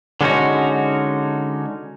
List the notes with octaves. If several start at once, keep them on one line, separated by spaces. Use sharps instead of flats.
D3 G#3 B3 C#4 D#4 F#4